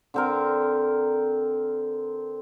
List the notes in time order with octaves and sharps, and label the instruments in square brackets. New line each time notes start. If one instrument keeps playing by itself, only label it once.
[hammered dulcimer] D3 C4 A#4